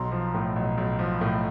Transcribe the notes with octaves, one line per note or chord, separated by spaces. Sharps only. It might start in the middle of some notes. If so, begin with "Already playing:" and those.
Already playing: B1 A#5 C6
F3
A2
B1
B1
F3
A2